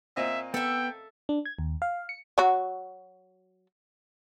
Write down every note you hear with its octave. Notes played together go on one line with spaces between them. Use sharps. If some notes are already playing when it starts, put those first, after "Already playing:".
A#2 C4 D#5 E5
B3 A4 E5 G5
D4
G#6
D#2
F5
C#7
F#3 F#4